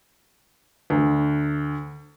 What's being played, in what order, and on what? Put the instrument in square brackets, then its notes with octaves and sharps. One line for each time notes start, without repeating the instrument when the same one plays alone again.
[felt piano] D2